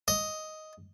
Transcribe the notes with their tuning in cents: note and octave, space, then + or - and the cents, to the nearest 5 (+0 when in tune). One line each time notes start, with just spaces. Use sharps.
D#5 +5